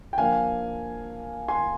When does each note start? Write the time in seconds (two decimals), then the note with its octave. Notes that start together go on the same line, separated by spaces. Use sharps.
0.13 G5
0.18 F3 A#3 D4 F5 G#5
1.48 G#5 C6